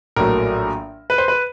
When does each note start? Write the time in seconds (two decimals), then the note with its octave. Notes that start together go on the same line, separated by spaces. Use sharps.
0.16 A#1 A2 F#3 A3 A#4
1.10 B4
1.18 C5
1.28 B4